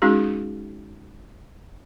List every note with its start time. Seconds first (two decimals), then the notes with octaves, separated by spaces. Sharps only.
0.02 G#3 C#4 D#4 F#4 G#4